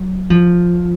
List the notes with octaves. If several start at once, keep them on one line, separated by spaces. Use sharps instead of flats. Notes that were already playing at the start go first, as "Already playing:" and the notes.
Already playing: F#3
F3